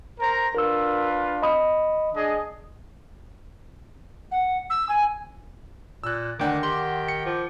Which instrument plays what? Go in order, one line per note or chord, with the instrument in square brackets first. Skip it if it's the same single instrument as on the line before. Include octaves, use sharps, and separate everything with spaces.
[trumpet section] A#4 C5 A#5
[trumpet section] D4 F4 B4 [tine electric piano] A#4 E6
[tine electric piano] D#5 B5 D#6
[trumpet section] D4 G#4 D#5
[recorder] F#5
E6
G#5
[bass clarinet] A#2 [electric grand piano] E6 F#6
[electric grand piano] D2 D4 [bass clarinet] D#3 [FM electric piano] F#5 G5 D6
[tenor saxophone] G4 [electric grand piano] C6
[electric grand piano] C#7
[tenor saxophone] F3